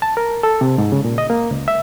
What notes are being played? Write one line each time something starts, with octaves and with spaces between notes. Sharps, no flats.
A5
A#4
A4
C3
G#2
C#3
A#2
D#5
A#3
C#2
E5